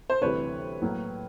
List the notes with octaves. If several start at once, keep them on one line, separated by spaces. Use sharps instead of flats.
C5
D2 C3 E3 G3 B4 C#5
A2 F#3 A#3